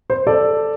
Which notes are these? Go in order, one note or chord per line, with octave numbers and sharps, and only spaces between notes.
C5
A4 D5